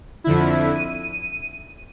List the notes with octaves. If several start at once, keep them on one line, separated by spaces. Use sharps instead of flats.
F2 D3 E4
D#7